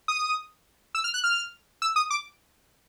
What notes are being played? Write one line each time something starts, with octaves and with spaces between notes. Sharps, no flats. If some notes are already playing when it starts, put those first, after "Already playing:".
D#6
E6
F6
F#6
F6
E6
D#6
D6